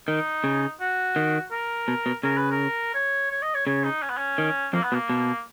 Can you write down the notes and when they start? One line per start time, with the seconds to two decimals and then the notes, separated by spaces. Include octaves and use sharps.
0.08 D#3 D#4
0.44 C#3
0.80 F#4
1.16 D#3
1.51 A#4
1.88 B2
2.06 B2
2.23 C#3 A#4
2.37 B4
2.51 A#4
2.94 C#5
3.31 C#5
3.42 D#5
3.54 C#5
3.66 C#3 C#5
3.85 D#4
4.02 C#4
4.10 B3
4.17 C#4
4.38 D#3
4.73 F2 F3 A#3
4.83 B3
4.92 B2 A#3
5.09 B2